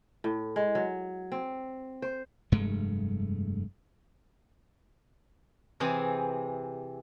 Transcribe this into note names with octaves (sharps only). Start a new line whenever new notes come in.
A2
G#3
F#3
C4
C5
F1 G2 G#3 A3
C3 E3 C4 G#4